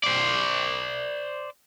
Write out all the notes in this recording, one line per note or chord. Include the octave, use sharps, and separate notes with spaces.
C5 D5